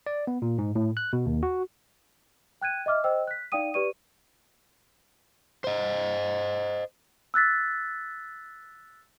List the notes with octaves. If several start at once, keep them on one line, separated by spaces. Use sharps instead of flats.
D5
B3
A#2
G#2
A2
F#6
B2
D#2
F#4
G5 F#6 G#6 D#7
D#5 E5 D6 F6
C5 D#5 G5 E6
F#6 B6
D#4 D5 F5 G5 D#6 D#7
G4 B4 D5 C#6 D#7
C5 D#5
E6 F#6 A6 B6